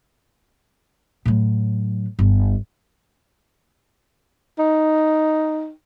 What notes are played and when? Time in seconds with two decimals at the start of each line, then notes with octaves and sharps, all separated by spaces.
1.25 A2 F#3
2.19 G1
4.59 D#4